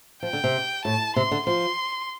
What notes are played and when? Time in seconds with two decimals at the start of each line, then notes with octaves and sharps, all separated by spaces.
0.23 F3 G5
0.33 D3
0.44 C3
0.85 A2 A5
1.16 C3 C6
1.31 D3
1.47 F3 C6